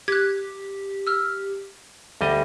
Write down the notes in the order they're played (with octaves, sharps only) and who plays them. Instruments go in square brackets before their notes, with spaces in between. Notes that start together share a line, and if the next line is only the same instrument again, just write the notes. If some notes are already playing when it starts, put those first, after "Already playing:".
[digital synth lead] G4 [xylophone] F#6 G#6
[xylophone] E6 F6
[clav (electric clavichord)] D2 G3 D#5